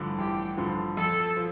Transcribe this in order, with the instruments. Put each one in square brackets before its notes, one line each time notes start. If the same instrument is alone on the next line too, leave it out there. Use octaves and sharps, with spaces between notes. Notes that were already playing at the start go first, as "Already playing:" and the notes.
Already playing: [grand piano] A1 G2 D3 F3
[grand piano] A1 [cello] G4
[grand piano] G2 D3 F3
[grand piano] F2 [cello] A4
[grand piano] F3